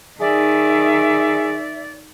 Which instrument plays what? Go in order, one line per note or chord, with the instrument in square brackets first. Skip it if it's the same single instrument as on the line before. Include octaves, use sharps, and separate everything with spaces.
[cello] D#3 [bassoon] G#4 [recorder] D5 [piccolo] E5